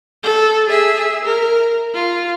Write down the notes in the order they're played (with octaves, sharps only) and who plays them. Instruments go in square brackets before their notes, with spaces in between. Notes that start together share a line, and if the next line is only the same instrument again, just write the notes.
[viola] A4
G#4 E5
A#4
F4